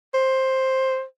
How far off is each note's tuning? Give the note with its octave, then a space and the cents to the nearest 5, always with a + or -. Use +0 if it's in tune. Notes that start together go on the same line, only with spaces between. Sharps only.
C5 +10